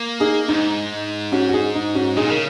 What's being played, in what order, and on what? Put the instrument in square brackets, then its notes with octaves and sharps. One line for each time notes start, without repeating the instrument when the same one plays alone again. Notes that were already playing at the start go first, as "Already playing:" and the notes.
Already playing: [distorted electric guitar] A#3
[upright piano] D#4 G#4
[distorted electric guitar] G#2 [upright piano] D#4
[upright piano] C#4 F#4
F#4
D#4 G#4
D#4
C#4 F#4
[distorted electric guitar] A#2 [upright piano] D#4 G#4
[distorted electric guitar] C#3 [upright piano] A#4